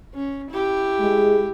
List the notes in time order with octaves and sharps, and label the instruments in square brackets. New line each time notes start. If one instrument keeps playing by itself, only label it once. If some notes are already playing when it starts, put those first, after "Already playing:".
[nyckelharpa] C#4
E4 G4
[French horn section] G#3